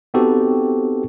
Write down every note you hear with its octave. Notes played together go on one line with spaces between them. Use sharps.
B3 C4 D#4 F#4 G4 A4